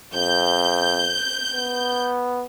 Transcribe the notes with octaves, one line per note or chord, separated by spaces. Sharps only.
F2 G6
B3